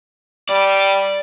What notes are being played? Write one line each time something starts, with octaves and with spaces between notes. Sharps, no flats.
G3 D5